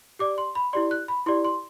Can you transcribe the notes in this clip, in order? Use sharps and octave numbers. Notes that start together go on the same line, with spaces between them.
G4 D5 D6
C6
B5
E4 G4 D5 C6
F#6
B5
E4 G4 D5 C6
C6